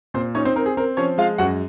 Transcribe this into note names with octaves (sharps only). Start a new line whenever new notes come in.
A#2 C4 C5
C#4 D#4 C#5
C4 C5
C4 A#4
G#4
C4 A#4
F3 C#4 C#5
G#3 F4 F5
F#2 F#4 F#5